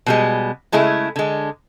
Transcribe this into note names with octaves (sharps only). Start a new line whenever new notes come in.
B2 G3 G#3
C#3 G#3 A3 E4
D3 G#3